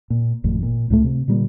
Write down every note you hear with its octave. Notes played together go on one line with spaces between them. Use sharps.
A#2
G#1 F2 A2
A#2
C#2 A2 F3 A3
C3
A#2 D3 G3 A#3